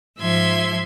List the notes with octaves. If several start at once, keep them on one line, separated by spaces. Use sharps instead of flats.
G#2 F3 E5 C6 G#6